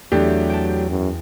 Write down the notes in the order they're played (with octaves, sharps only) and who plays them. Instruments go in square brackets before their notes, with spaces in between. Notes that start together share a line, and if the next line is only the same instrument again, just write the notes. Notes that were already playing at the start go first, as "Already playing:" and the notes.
[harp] E2 [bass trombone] F#3 [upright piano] A3 D4 G4
[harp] G5 A5
[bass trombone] F#2